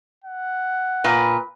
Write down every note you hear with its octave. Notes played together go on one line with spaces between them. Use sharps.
F#5
A#2 B4